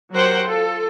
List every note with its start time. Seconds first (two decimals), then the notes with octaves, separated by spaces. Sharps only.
0.13 F#3 G4 A#4 C5 F#5 G5
0.44 F4 A4